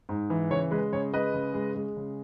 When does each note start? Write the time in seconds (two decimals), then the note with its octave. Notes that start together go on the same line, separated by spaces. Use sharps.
0.09 G#2
0.30 E3
0.51 C#3 C#5
0.71 G#3 B4
0.92 C#3 C#5
1.13 G#3 B4 D#5
1.34 C#3
1.54 G#3
1.75 G#3
1.97 C#3